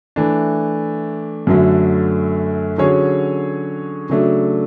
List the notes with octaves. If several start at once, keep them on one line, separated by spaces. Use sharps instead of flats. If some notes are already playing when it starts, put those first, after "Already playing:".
E3 A3 D4
F#2 D3 F#3 A3
D3 F#3 C#4 G#4 C#5
C#3 F#3 A3 D4